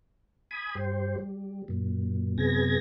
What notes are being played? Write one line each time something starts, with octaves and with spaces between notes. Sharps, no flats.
G#5 B5 D#6
G2 G4 C5
G3
F#2 A#2
F#2 C3 B3 G#4 G#6 A#6